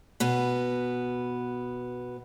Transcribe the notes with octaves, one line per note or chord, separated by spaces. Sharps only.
B2 B3